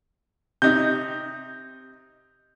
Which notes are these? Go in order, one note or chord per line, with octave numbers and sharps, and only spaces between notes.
C3 D#4 G6